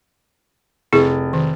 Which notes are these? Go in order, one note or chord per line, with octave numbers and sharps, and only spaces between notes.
F1 E4 G#4
D#3